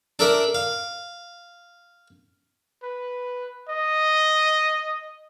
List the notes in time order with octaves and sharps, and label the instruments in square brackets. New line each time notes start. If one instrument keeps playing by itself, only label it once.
[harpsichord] D4 A4 A#4 D5 E5
F5
[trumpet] B4
D#5